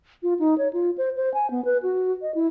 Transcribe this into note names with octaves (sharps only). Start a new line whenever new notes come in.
F4
D#4
C#5
F4
C5
C5
G#5
B3
B4
F#4
D#5
E4